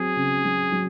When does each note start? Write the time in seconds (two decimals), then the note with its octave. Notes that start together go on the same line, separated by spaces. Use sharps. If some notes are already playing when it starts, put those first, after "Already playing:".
Already playing: F#3 C4 G#4
0.16 C#3
0.45 F#3
0.72 F#3